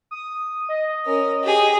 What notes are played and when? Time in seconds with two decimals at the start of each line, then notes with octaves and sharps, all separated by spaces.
0.11 D#6
0.69 D#5
1.05 C#4 A#4
1.43 G4 G#4